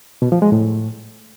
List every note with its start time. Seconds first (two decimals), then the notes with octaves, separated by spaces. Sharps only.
0.22 B2
0.32 F3
0.42 G#3
0.52 A2